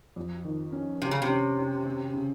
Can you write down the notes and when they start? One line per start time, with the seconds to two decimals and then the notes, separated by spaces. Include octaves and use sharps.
0.16 F2
0.45 D#3
0.72 C#4
1.02 C3 C#4
1.11 C#3
1.22 C3
1.29 C#4
1.58 C#4
1.85 C4
2.13 C#3